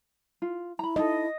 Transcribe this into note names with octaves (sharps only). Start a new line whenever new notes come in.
F4
E4 A#5 B5
D#4 A4 D#5